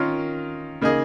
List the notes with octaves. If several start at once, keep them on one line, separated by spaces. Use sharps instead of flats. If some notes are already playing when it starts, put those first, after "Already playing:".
Already playing: D#3 C#4 F4 A#4
C#3 A#3 D#4 G#4